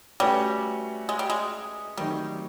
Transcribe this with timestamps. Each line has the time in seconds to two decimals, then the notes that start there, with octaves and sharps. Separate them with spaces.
0.20 G3 A3 C#4 F#4 B4
1.09 G#3
1.19 G3
1.30 G#3
1.97 D#3 F#3 G3 A3 C4 D#4